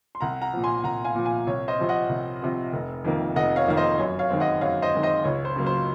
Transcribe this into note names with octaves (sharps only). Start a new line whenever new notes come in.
C6
C2 F#5 A#5
F#5 A#5
A#2 F3
G#5 C6
C2 F#5 A#5
F5 G#5
A#2 F3
F5 G#5
C2 C#5
C5 D#5
C3 F3 C4
D#5 F#5
C2
C3 F3 C4
F1
F2 D#3 A#3
F1 D#5 F#5
C#5 F5
F2 D#3 A#3 F5
C5 D#5
F#2 C#5
C#5 F5
D#3 G#3 C4
D#5 F#5
F#2 C#5 F5
C5 D#5
D#3 G#3 C4
C5 D#5
C#2 C#5
C5
C#3 F#3 A#3
C5